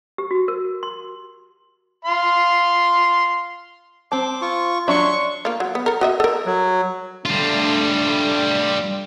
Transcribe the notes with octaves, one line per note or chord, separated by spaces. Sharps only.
G4
F#4
A#4
C6
F5 C6
C4 A5 D6
F4 C#6
F#3 D4 C#5 E5 C6 C#6
A#3 F4
F#3
B3
A4 A#4
F#4 D#5 E5
A4 A#4
F#3
G3 A3 D4 F4